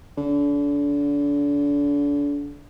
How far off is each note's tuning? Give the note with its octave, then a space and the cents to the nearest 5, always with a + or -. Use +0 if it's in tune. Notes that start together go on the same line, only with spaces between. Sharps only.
D3 -35